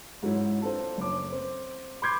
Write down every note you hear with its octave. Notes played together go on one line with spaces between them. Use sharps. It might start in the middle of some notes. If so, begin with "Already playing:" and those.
G#2 F#3 C#4 E4
C4 D4 F4 A4
F#1 C#4 D6
C4
B5 C6 D6 G6 G#6 C7